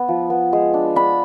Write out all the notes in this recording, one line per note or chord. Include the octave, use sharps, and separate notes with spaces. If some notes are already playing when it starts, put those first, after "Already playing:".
Already playing: B3
F3
B3
G#3
D4
D4 B5